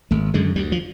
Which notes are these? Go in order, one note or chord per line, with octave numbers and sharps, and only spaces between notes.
G#1 A3
F#2 D3 G#3
D2 G3
F3